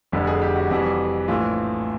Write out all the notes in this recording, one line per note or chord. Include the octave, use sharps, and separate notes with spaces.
F1 F2 D3 G3
G#4
G4
F#4
F2 C3 E3 G3 F#4
A#1 A2 E3 F4